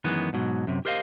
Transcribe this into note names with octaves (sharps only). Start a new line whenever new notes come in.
F#2 D#3 E3 G#3 B3
G#2 B2 F#3
F#2 C3
G4 A#4 C5 D5 D#5 F5